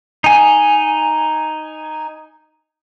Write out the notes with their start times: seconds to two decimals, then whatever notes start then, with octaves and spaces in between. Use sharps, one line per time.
0.24 D#4 G#5